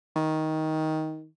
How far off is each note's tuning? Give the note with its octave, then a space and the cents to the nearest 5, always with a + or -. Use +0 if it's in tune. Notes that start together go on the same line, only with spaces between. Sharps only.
D#3 +15